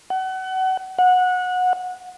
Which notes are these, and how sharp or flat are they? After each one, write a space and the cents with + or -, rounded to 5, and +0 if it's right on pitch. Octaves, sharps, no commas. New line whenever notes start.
F#5 +30
F#5 -20